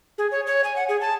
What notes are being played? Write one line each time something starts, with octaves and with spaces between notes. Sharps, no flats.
G#4
C#5
C#5
G#5
F#5
G#4
A5